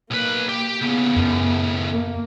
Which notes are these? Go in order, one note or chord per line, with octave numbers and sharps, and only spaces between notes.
B1 A#3 B4
G4
A2 C#3 B3
F#2
A#3